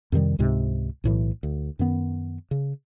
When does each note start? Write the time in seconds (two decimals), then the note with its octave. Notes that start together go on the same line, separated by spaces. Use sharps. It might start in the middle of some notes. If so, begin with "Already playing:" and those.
0.12 F2 C3 D#3 G3
0.39 C#2 G#2 C3 G#3
1.04 B1 A2 E3
1.43 D2
1.79 F#2 D#3 B3
2.51 C#3